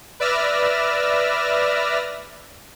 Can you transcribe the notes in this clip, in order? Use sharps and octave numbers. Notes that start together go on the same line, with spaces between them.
B4 D5 E5 E6 F6 A#6